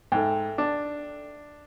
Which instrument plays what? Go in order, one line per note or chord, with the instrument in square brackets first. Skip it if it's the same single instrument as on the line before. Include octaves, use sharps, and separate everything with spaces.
[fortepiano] G#2 [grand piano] A4 E5 G5
[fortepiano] D4